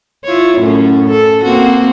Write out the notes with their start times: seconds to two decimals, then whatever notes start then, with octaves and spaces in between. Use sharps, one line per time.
0.24 E4 F4 C#5
0.59 F#2 A2 C#4
1.11 A4
1.44 A#3 C4 F#4